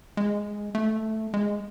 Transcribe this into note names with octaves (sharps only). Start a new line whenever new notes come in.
G#3
A3
G#3